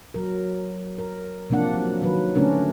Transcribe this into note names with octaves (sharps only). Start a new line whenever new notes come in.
F#3 A#4
A#4
C3 F3 A#3 D4 F#5
F#3
D#3 F#3 B4
D3 A3 C#4 D4 A#4